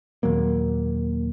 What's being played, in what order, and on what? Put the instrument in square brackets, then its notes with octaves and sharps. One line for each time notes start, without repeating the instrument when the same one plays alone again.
[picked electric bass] D#2 A#2 F#3 A#3